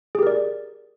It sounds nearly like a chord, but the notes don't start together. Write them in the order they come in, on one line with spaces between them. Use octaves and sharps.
G#4 G4 A#4 D5